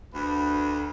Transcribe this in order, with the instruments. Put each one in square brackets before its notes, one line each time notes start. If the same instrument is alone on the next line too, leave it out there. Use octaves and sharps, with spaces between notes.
[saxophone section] D2 [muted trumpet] B4